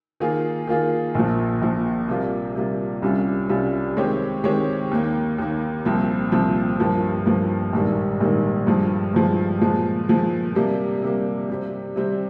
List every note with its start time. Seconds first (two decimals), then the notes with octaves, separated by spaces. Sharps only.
0.20 D#3 A#3 F4 G#4
0.67 D#3 A#3 F4 G#4
1.15 A#1 A#2 F3
1.62 A#1 A#2 F3
2.08 C3 G3 A#3 F4
2.55 C3 G3 A#3 F4
3.02 C2 C3 G3 C#4 F4
3.49 C2 C3 G3 C#4 F4
3.96 D#3 G#3 C4 G4 C#5
4.44 D#3 G#3 C4 G4 C#5
4.91 D#2 D#3 A#3
5.38 D#2 D#3 A#3
5.85 C2 A#2 F3 C4
6.32 C2 A#2 F3 C4
6.79 G2 F3 A#3
7.26 G2 F3 A#3
7.73 A#1 G#2 D#3 G3 A#3
8.20 A#1 G#2 D#3 G3 A#3
8.67 G2 F3 G#3
9.14 G2 F3 G#3
9.61 A#2 F3 G#3
10.08 A#2 F3 G#3
10.55 C3 G3 A#3
11.03 C3 G3 A#3
11.50 C3 G3 C4
11.96 C3 G3 C4